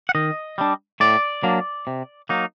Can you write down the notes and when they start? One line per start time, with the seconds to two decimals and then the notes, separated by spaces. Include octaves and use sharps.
0.09 F#5
0.15 D#3 D#5
0.58 G3 D4
1.00 A2 D5
1.43 F#3 A#3 D4
1.87 C3
2.29 F#3 A#3 D#4